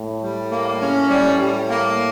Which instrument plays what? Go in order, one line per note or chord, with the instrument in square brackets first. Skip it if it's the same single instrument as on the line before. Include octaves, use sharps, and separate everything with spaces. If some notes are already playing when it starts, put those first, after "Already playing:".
Already playing: [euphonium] A2
[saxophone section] G3
A#3
C#4
G3
G3
A#3